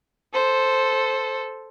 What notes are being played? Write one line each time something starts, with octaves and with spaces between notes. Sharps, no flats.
A4 C5